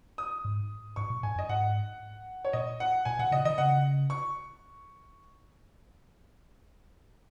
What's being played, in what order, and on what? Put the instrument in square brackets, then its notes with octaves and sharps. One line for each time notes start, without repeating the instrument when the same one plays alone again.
[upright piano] D#6
[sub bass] G#2
[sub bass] G#2 [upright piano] C#6
[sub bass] A#2
[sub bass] G#2 [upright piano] G#5
[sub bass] F#2
[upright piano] D#5
[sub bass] G#2 [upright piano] F#5
[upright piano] C#5
[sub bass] A#2 [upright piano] D#5
[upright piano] F#5
[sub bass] A#2 [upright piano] G#5
[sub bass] A#2 [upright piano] F#5
[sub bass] C#3 [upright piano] D#5
[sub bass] D#3 [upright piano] D#5
[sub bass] C#3 [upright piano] F#5
[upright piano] C#6